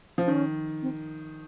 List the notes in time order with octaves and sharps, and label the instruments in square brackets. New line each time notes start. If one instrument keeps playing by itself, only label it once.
[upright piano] F3
[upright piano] D#3 [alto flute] C#4
[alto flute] C4